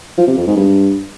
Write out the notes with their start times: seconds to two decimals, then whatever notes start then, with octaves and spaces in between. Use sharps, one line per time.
0.17 F3
0.27 C3
0.37 F2
0.47 G#2
0.56 G2